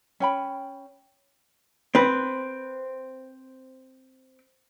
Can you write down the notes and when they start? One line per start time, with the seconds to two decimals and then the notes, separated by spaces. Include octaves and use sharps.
0.20 C#4 G5 B5
1.95 C4 B4